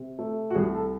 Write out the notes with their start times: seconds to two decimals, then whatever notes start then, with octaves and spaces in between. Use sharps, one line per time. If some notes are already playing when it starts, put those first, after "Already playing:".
Already playing: C3
0.19 A3
0.50 F#4
0.55 C2 G#4
0.74 A4